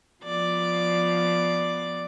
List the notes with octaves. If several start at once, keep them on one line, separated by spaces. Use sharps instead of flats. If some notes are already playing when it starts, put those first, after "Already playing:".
F3 B3 D5